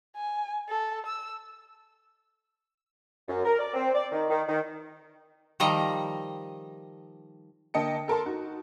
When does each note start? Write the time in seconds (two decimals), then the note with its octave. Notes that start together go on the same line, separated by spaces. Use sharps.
0.16 G#5
0.69 A4
1.06 E6
3.28 F#2
3.45 A#4
3.59 D5
3.74 C4
3.94 D5
4.12 D#3
4.29 D#3
4.47 D#3
5.60 D#3 F3 G3 D#5 A#5
7.74 D3 A#3 D#5 G5 A5 C#7
8.08 A4 A#4 A5 C6
8.26 D#4 F#4